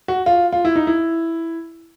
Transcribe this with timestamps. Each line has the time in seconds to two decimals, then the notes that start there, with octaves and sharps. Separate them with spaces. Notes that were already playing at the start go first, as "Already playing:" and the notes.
0.08 F#4
0.26 F4
0.53 F4
0.65 E4
0.76 D#4
0.87 E4